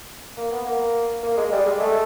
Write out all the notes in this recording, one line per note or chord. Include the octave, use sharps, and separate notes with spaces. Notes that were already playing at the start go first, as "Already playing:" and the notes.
A#3
B3
A#3
A#3
G#3
G3
G#3
A3